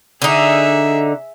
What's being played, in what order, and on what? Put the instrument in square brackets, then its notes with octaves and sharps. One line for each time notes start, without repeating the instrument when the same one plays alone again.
[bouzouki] D3 D#4 [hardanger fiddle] G#4 E5